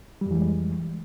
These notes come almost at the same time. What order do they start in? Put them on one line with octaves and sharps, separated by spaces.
G3 F2 E3 G#3